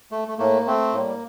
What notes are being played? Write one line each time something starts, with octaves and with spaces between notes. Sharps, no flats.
A3
A3
A2 A3 A#3
A3 C4
A2 G3 A#3